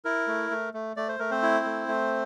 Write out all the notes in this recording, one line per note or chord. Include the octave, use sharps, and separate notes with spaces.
E4 A#4
A3
A3
A3
A3 D5
C5
A3 A#4
C4 C5
E4
A3
A3